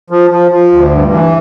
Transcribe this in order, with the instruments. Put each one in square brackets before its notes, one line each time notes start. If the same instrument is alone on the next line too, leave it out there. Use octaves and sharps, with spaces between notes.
[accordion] F3
F3
F3
D2
G2
E3